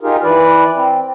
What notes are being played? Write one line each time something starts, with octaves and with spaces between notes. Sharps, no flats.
D#4 F4 G4 G#4 A#4
E3 B4 D5
C4